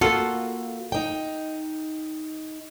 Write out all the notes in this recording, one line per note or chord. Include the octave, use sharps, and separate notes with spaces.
A#3 F4 F#4 A4
D#4 G5